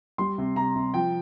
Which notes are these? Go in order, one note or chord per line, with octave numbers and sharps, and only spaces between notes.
G3 C6
C3
C3 A#5
C3
F3 G5